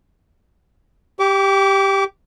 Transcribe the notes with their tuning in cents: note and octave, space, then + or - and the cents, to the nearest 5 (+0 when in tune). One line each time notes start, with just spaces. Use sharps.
G4 +0 D6 -30